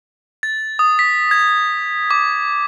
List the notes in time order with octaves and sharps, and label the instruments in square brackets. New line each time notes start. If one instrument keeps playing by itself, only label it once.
[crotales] A6
D#6
B6
G#6
D6